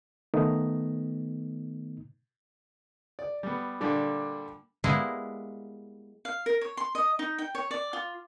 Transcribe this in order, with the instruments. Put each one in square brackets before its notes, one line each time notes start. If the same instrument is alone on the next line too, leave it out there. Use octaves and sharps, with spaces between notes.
[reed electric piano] D#3 A3 B3 D#4
[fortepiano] D5
G3 B3
A#2 D3 G3 D4
[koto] G3 G#3 A#3 B3 E4 G#4
[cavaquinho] F5
A#4
C#5
C6
D#5
D#4
G5
C#5
D5
F4